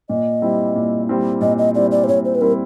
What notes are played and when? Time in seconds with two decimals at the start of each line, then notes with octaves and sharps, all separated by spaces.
0.09 A#2 D#5
0.42 G3 C4 E4
0.76 A#2
1.09 G3 C4 E4
1.41 A#2 D#5
1.58 D#5
1.75 G3 C4 E4 D5
1.91 D5
2.04 C5
2.08 A#2 C#5
2.25 C5
2.35 B4
2.41 G3 C4 E4 A#4